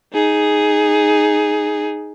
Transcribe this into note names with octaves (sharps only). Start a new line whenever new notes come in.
D#4 G#4